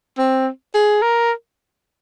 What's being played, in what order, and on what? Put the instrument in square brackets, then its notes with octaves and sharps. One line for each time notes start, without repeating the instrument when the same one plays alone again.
[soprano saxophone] C4
G#4
A#4